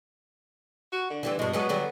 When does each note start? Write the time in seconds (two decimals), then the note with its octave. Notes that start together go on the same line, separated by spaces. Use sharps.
0.92 F#4
1.10 D3
1.23 E3 G3 C4
1.39 G2 B2 G#3
1.53 F#3 G#3 B3 G#4
1.69 D3 F#3 G3